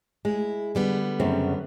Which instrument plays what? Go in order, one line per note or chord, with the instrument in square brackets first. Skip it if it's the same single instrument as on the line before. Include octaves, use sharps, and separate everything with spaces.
[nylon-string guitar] G#3 [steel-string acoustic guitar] E4
[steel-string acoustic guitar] D3 G3 B3
[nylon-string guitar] F#2 C#3 C4